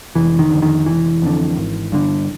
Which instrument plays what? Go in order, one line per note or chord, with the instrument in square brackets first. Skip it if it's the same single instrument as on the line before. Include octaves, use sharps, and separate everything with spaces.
[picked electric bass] F1 E3
D#3
F2 D3
D#3
F1 E3
F2 D3
G#1
G2 D3